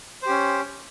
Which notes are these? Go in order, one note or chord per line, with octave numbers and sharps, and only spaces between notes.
C#4 G4 C5